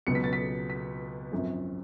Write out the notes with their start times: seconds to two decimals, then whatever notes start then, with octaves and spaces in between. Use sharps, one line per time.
0.07 C#2 B2 F#3 B3 C#7
0.15 B6
0.24 A6
0.33 B6
0.70 B6
1.31 G#1 F#2 F3